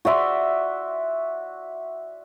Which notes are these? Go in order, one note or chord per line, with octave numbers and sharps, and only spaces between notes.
F#4 D5 E5 C6